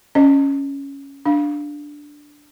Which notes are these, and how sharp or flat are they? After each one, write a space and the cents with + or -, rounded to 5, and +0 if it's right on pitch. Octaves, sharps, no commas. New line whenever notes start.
C#4 +0 D#5 -25
D4 +0 F5 +0